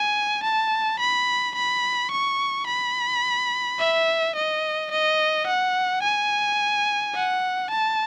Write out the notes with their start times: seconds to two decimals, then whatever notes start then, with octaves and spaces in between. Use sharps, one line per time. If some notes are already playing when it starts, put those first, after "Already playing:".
Already playing: G#5
0.44 A5
1.00 B5
1.56 B5
2.12 C#6
2.67 B5
3.79 E5
4.36 D#5
4.92 D#5
5.47 F#5
6.03 G#5
7.14 F#5
7.71 A5